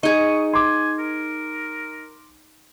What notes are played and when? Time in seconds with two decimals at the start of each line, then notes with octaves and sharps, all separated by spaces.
0.03 D#4 G#4 D#5 C#6
0.54 G#5 C6 D6
0.99 A#4